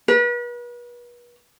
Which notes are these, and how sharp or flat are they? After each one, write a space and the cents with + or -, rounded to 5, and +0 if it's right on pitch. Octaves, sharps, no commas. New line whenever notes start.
B4 -40